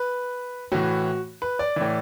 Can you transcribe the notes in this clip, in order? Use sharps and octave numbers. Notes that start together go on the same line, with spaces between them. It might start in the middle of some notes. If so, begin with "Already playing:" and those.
Already playing: B4
A2 E3 F#4
B4
D5
A2 E3